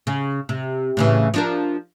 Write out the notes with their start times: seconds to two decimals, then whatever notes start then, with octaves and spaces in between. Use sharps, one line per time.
0.07 C#3
0.49 C3
0.97 A2 C#3 E3
1.34 F3 D4 A#4